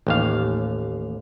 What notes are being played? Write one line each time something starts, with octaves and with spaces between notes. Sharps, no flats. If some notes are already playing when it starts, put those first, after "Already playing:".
A1 D#2 F5